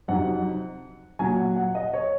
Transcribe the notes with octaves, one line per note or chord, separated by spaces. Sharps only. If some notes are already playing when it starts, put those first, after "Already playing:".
F2 C3 D#3 F#3 F#5
A#2 F#3 G#5
F#5
F#5
D#5
C#5